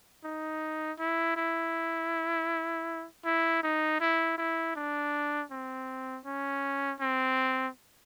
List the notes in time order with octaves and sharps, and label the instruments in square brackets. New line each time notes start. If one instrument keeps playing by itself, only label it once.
[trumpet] D#4
E4
E4
E4
D#4
E4
E4
D4
C4
C#4
C4